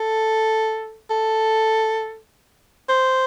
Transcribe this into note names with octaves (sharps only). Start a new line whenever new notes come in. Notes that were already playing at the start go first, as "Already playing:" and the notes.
Already playing: A4
A4
C5